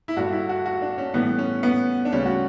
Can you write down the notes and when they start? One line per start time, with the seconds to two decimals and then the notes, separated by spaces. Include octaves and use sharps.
0.08 E4
0.16 G2 D3 G3 F#4
0.32 E4
0.49 F#4
0.66 F#4
0.82 D4
0.98 C#4
1.14 A2 E3 G3 B3
1.38 C#4
1.63 B3
2.05 D4
2.12 D2 C#3 G3 C#4
2.25 F#4